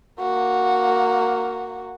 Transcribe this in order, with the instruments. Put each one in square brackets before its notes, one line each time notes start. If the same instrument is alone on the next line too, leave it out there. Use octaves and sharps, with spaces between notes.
[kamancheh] A#3 F#4